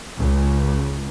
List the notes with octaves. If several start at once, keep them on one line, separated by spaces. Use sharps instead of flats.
C#2